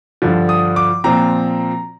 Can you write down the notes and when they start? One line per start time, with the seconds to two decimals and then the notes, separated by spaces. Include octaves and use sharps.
0.22 G2 D3 F3
0.49 D#6
0.76 D6
1.04 A#2 F3 C4 A#5